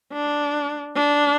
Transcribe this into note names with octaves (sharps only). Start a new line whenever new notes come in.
D4
D4